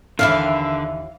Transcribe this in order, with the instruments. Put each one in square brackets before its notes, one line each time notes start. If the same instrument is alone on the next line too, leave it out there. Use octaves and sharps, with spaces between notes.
[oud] D#2 E3 E4 [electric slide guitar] D3 [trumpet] E5 [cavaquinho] F5